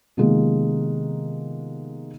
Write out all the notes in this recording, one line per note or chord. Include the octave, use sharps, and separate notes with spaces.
C3 D#3 F3 G#3 A#3 B3